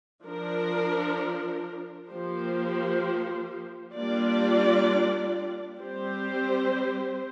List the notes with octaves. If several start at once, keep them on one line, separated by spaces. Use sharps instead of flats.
F3 D4 A#4
F3 A#3 G4 C5
G3 A#3 D4 F4 D5
G3 C4 G4 C5